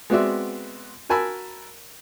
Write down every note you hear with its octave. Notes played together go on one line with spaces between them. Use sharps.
G#3 B3 C4 F#4 D5 E5
F#4 A#4 G#5 A5 B5 E6